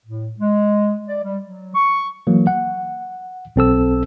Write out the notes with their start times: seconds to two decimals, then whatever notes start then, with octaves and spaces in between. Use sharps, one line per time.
0.06 A2
0.38 G#3
1.08 D5
1.23 G3
1.45 F#3
1.74 C#6
2.27 E3 F#3 A#3
2.47 F#5
3.56 B1 C4 A4 E6